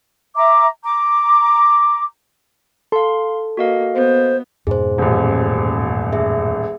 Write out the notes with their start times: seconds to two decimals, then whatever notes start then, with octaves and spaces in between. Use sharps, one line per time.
0.36 E5 A#5 D6
0.83 A#5 D6
2.92 A4 F5 C6
3.57 A#3 F#4 D#5 F5
3.95 B3 C5
4.67 F2 G#2 B2 G#4 C5
4.98 D#1 A1
6.13 G#4 E5